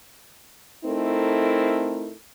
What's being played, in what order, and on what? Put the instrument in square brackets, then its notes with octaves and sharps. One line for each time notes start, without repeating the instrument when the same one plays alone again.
[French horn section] A3 C4 D#4 E4 A4 A#4